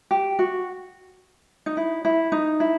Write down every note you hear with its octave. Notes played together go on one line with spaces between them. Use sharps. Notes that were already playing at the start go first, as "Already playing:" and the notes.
G4
F#4
D#4
E4
E4
D#4
E4